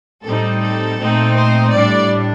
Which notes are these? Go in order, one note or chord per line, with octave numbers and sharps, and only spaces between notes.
A2 G3 C4 D#4 A4
A4
A#2 A3 C4 D#4
C5
A2 G3 D4 D5